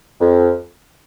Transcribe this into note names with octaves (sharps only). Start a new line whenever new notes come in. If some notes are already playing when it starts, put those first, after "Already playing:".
F2